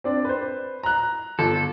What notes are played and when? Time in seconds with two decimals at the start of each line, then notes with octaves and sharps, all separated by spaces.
0.04 C4 D4 D5
0.25 B4 C5
0.83 A#5 F#6
1.39 G1 A4